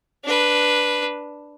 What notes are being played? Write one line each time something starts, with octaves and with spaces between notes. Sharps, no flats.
D4 B4